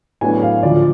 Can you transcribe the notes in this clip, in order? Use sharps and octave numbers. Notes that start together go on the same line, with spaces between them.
A2 F#3 B3 D4 G#5
F5
D2 D3 F3 D5